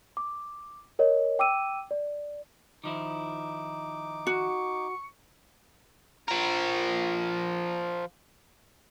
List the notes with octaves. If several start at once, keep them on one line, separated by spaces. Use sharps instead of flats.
D6
A#4 C#5 D#5
G5 D6 E6 D#7
D5
D#3 F3 D#4 E4 D6
F#4 C#6
F3 A#4